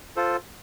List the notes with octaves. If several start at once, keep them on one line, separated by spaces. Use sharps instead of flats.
F4 A4 C5